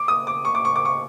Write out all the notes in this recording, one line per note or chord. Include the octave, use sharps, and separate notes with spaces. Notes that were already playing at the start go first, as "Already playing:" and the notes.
Already playing: D6
D#6
D6
C#6
D6
C#6
D6
C#6